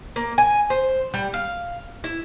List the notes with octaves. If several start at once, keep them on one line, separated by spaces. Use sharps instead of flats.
A#3
G#5
C5
G3
F5
E4